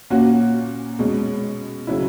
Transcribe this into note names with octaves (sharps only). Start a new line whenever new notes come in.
A#2 A#3 C#4 F#4
B2 G#3 C#4
C#3 F#3 C#4 E4